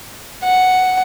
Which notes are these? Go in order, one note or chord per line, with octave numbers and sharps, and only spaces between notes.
F#5